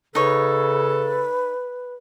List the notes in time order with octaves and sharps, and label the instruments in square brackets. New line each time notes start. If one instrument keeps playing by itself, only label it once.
[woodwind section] C#3 A4 [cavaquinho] D#4 C#5 [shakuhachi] B4